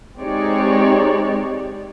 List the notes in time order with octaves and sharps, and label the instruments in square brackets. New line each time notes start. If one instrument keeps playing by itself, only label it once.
[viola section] G#3 C4 D#4 G4 C#5 D5